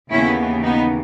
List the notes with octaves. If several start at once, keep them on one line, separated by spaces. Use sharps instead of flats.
D#2 C#3 E3 B3 C#4 E4
B3 D#4